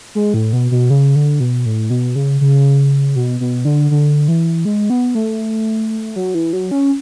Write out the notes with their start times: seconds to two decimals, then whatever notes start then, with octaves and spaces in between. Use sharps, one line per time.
0.15 G#3
0.34 A2
0.53 B2
0.71 B2
0.90 C#3
1.15 D3
1.40 B2
1.66 A2
1.90 B2
2.15 C#3
2.41 C#3
3.16 B2
3.40 B2
3.65 D3
3.91 D3
4.28 E3
4.65 G#3
4.90 B3
5.15 A3
6.16 F#3
6.34 E3
6.53 F#3
6.71 C#4